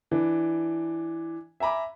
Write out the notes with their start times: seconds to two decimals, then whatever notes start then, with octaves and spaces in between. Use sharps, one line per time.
0.11 E3 D4
1.60 E5 G#5 A#5 B5 D6